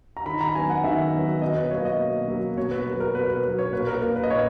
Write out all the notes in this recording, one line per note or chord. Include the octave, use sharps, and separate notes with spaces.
A#5
D#3 B5
A#5
F#3 B3 G#5
F#5
D#3 E5
F#3 B3
B2 D#5
B4
F#3 A#3 C#5
D#5
B2
F#3 A#3
B2 C#5
B4
F#3 B3 A#4
A#4
B2 B4
B4
F#3 B3 B4
C#5
A#2 B4
A#4
A#3 A#4
B4
D#5
A#2 C#5